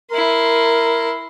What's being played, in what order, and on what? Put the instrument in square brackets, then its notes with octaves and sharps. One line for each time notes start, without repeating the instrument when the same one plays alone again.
[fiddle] E4 C6 [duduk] A#4